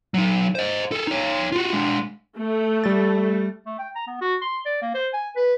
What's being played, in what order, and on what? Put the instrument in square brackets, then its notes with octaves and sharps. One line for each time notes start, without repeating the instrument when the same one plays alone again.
[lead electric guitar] F#3 D#4
C5 D#5
G#4 A4
D#4 C#5
F4 F#4
G#3 D4
[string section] A3
[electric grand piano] G3 A6
[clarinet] A3
G5
A#5
B3
F#4
C6
D5
A#3
C5
G#5
B4